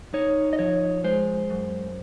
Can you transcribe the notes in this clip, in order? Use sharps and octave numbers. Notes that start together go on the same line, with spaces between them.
D#4 C#5
D#5
F3 C#5
G#3 C5
F#2